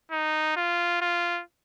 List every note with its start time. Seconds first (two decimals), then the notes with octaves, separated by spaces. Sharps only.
0.12 D#4
0.57 F4
1.01 F4